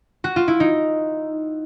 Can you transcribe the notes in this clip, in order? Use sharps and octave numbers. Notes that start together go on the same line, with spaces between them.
F#4
F4
E4
D#4